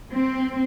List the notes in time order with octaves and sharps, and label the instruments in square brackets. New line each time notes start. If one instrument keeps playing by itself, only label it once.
[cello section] C4